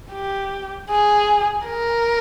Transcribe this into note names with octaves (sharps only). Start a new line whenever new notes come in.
G4
G#4
A#4